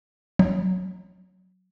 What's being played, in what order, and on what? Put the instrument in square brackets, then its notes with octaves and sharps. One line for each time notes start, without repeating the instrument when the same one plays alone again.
[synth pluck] F#3